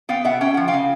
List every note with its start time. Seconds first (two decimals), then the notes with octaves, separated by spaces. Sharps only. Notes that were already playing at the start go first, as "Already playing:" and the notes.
0.09 B3 F5 G5
0.24 B2 E5 F#5
0.41 C#4 G5
0.54 F3 F#5
0.68 F5 G5
0.73 C#3